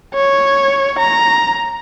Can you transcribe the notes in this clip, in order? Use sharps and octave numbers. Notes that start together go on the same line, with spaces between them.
C#5
A#5